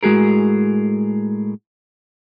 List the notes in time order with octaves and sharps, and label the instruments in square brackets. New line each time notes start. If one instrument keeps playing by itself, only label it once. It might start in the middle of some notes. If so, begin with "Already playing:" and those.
[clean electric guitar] A2 G#3 F#4 G#4 A#4